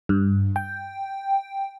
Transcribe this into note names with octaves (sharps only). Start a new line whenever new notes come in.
G2
G5